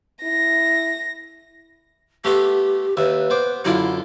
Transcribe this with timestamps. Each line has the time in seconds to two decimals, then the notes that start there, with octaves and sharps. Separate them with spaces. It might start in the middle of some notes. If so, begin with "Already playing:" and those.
0.23 E4 A#6
2.25 A3 B3 G4 C6
2.97 D#2 B4 E5
3.30 B3 C5 D6
3.65 F#2 D3 E4 F4